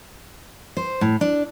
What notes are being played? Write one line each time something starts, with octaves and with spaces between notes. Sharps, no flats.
C5
A2
D4